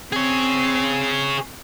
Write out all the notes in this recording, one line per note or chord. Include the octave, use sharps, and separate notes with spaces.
C4 G#4 C#5